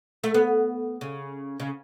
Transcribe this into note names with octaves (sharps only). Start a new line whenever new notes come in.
A3
B3
C#3
C#3